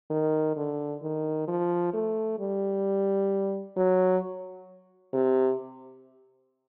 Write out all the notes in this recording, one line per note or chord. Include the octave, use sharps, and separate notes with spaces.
D#3
D3
D#3
F3
A3
G3
F#3
C3